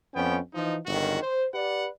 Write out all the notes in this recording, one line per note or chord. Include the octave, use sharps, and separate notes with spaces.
F2 B3 C#4 G5
E3 F3 D#4
G1 C#2 D#3 F#4
C5
G4 B4 D5 F#5